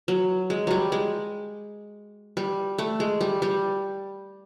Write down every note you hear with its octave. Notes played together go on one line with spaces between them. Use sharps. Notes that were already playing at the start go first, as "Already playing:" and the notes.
F#3
G#3
F#3 G3
G#3
G3
A3
G#3
G3
G3